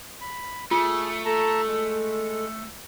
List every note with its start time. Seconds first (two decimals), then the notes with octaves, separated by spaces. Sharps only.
0.21 B5
0.71 A3 F4 G#4
1.25 A4 A5 A#5
1.66 G#3